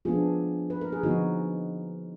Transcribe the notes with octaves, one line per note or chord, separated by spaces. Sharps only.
F3 B3 D4 F4 G#4
B4
A#4
G#4
D3 F3 B3 D#4 F#4